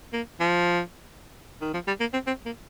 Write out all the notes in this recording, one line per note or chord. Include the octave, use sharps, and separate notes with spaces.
A#3
F3
D#3
F3
G3
A#3
C4
C4
A#3